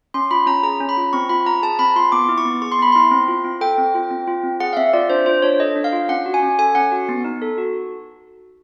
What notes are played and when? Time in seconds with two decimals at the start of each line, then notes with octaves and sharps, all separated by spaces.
0.14 C#4 C6
0.31 F4 B5
0.47 C#4 A#5
0.63 G#4 A#5
0.80 C#4
0.89 B5
0.97 F4
1.13 C4 C#6
1.29 F4 B5
1.46 C4 A#5
1.62 G#4 A5
1.79 C4 B5
1.96 F4 C6
2.12 B3 D6
2.29 E4
2.38 C#6
2.45 B3
2.62 G#4 C#6
2.72 C6
2.79 B3 B5
2.92 E4 C6
3.11 C4
3.28 F4
3.45 C4
3.61 A4 G5
3.78 C4
3.95 F4
4.11 C4
4.27 F4
4.44 C4
4.60 G#4 F#5
4.73 F5
4.77 C4 E5
4.93 F4 D5
5.10 D4 C5
5.26 F4 C5
5.42 D4 C#5
5.60 A4 D#5
5.76 D4
5.84 F5
5.93 F4
6.09 C#4 F#5
6.26 F#4
6.34 G#5
6.42 C#4
6.58 A4 G#5
6.75 C#4 F#5
6.92 F#4
7.09 B3
7.24 D#4
7.42 A4
7.58 F#4